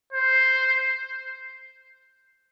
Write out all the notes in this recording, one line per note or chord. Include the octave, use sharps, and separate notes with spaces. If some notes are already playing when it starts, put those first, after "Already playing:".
C5